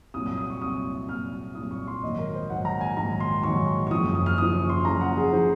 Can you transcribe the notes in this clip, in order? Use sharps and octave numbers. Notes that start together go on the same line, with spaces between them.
C2 A#2 F#3 D#6
D#6
D#6
C#6
C2 A#2 F#3 D#6
C2 A#2 F#3 F6
C2 A#2 F#3 D#6
C#6
C6
A#1 G#2 D#3 F#3 D#5
A#4
C5
A#1 G#2 D#3 F#3 F#5
A#5
G#5
A#1 G#2 D#3 F#3 A#5
C6
A#1 G#2 D#3 F#3 C#6
C#6
F#1 F#2 F3 D#6
D#6
F6
F#1 F#2 F3 D#6
C#6
C6
F#1 F#2 F3 A#5
F#5
G#4
F3 C5